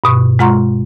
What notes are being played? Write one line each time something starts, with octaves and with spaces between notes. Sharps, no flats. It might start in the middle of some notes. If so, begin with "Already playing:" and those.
G2 B2 C#6
G#3 F4 F#5 A#5 C6 C#6